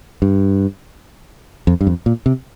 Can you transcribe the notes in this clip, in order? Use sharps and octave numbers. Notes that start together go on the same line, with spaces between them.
G2
F2
G2
F2
A#2
C3